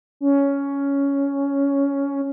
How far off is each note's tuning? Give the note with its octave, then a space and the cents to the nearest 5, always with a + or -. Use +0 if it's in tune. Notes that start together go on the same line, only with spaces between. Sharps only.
C#4 +10